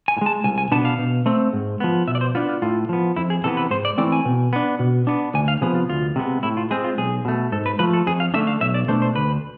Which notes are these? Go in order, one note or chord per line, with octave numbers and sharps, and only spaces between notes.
G#5
A2
G#3 A5
C2 G#5
G#5
B2 B3 D4 A5
F5
B2
A3 C4
G#2
F3 B3
B2 E5
D5
C5
B3 D4 F4
F4
A2 F4
F3 B3
F2 E4
G#4
C3 E3 B3 A4
B4
G#2 C5
D5
E3 A3 C4 D5
G#5
B2
B3 D4
B2
B3 D4
D2 G#5
F5
C3 F3 B3 G#4
F4
D2 F4
C3 G#3 B3
A2 E4
F4
G#3 C4 G#4
F4
B1 G#4
B2 A3
G#2 A4
B4
F3 A3 B4
A4
F2 G#4
F5
D3 A3 D4 E5
F5
B1 E5
D5
B2 A3 D4 C5
C5
D2 B4